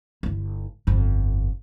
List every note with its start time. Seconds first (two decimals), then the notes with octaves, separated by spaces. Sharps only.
0.23 G1 E4
0.87 G1 F2